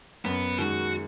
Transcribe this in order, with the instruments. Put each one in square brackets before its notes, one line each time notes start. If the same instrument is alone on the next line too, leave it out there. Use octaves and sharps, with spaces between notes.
[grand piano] F#2 [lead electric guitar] B3
[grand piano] D#3 G#3 [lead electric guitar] F#4